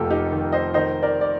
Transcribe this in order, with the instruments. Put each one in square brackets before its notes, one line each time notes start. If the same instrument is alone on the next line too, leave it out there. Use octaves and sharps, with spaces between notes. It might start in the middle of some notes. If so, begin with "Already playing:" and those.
Already playing: [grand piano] F1 F2 A#3 F4 G4 A4
D#4 G4
D#3
C5 D#5
D#3 C5 D#5
A#4 D5
D5